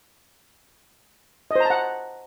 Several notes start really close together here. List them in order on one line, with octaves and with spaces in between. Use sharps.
D#5 C5 A#5 A5 F#5